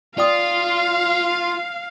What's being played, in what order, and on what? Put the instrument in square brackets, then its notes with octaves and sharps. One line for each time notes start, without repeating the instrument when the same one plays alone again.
[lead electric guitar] F4 [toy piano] D5 G5 D#6 [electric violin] F5